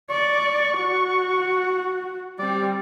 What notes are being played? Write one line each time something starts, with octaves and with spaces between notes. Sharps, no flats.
D5 C#6
F#4
G3 C4 D5